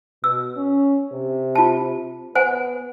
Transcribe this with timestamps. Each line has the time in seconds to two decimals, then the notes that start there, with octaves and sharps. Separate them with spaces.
0.24 B2 E6
0.56 C#4
1.12 C3
1.55 F4 A5
2.35 B3 C5 F#5 G#5